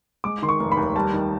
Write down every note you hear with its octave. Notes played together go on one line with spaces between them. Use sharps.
G#3 D6
D#3 C6
C#6
F1
B5
D#2
G3 A5
D#3